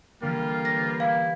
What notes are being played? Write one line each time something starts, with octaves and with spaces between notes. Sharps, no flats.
D3 E3 G3 A#3 F4
B4 C#5 A#6
E4 F5